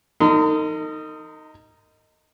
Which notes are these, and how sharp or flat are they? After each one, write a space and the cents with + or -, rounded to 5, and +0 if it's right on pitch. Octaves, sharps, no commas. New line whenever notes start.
D#4 +0 A#4 -45 C6 -40